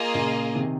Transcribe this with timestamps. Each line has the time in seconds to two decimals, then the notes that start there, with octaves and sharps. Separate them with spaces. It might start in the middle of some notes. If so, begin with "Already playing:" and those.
Already playing: A#3 F4 G#4 D#5
0.14 A#2 C#3
0.55 C3 D#3